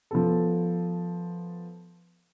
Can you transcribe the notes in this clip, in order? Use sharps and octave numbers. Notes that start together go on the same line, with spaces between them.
F3 B3 A4